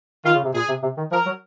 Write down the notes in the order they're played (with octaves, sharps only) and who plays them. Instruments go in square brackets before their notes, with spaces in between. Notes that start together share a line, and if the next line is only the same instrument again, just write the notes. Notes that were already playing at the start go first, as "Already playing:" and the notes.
[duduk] D#3 [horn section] F4
[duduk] C#3
C3
[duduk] A#2 [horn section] G#4
[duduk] C3
C3
D#3
[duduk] F3 [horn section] A#4
[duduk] F#3